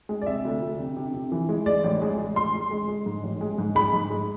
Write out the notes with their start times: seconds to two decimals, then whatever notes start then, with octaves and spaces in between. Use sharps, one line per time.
0.09 G#3
0.22 D5
0.26 C3 E5
0.45 D2
0.62 D2
0.79 C3
0.97 C3
1.14 C3
1.32 E3
1.49 G#3
1.66 G#3 D5
1.84 A1
2.02 G#3
2.18 G#3
2.36 A1 C6
2.54 G#3
2.71 G#3
2.88 G#3
3.06 G#2
3.23 A1
3.41 G#3
3.58 G#2
3.75 G#3 B5
3.93 G#2
4.10 G#3